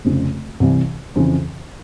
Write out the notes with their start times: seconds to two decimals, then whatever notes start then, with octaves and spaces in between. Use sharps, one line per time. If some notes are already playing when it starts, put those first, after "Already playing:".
0.05 F1 F2 C#3
0.60 C2 C3 E3
1.15 F2 C#3 E3